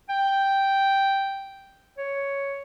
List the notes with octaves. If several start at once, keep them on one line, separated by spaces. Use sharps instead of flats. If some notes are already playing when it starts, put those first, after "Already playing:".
G5
C#5